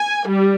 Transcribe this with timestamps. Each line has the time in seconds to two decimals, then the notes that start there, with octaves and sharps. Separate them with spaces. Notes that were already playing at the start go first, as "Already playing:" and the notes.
Already playing: G#5
0.27 G3